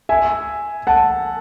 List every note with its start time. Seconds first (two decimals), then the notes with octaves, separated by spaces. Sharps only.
0.09 E5 G#5
0.87 F#5 A5